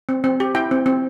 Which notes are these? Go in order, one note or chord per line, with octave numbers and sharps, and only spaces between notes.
C4
C4
G4
E4 G5
C4
C4